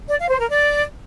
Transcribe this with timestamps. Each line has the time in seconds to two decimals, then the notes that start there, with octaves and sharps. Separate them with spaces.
0.09 D5
0.19 F5
0.29 C5
0.39 A#4
0.49 D5